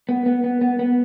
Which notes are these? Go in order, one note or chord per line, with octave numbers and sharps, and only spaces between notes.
B3
B3
B3
B3
B3